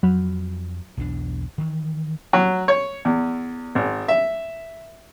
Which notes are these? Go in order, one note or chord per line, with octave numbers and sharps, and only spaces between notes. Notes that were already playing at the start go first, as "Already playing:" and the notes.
F2 F#3 F#4 B5
B1 E2 D4
D#3 E3
F#3
C#5
E2
G#1
E5